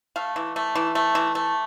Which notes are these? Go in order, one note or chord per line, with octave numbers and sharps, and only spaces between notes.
A3 F5
E3
A3
E3
A3
E3
A3